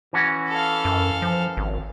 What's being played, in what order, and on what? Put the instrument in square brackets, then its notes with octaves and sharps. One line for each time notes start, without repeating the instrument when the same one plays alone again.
[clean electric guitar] E3 C#4 F#4
[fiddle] A4 F5
[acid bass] F#2
F3
G#1